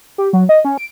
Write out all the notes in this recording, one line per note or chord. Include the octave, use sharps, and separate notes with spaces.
G4
F#3
D#5
C#4
D7